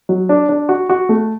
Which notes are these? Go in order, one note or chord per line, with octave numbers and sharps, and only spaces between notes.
F#3
D4
D4
F#4
F#4
A3